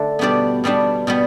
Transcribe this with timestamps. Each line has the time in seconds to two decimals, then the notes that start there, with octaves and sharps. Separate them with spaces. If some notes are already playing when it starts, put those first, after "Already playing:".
Already playing: D3 A3 A4
0.19 B2 G3 B3 D4 D5
0.64 B2 G3 B3 D4
1.07 B2 G3 B3